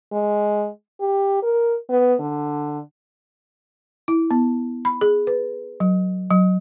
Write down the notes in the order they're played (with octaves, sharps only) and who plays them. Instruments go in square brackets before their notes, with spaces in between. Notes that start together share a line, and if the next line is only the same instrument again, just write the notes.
[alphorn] G#3
G4
A#4
B3
D3
[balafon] E4
B3
B5
G#4
B4
F#3
F#3